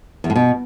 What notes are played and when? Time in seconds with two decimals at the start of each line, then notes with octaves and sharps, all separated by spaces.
0.24 E2
0.30 A2
0.36 B2